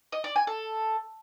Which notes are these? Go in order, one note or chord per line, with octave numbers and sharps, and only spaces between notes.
D#5
D5
G#5
A4